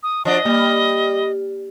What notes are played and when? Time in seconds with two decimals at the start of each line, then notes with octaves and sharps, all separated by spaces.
0.03 D#6
0.25 F3 D4 D#5
0.45 G3 A#3